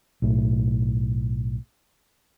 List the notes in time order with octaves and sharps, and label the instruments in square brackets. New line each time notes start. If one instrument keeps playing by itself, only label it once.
[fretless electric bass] B1 A2